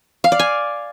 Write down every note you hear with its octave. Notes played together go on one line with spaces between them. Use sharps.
F5
D5
G#5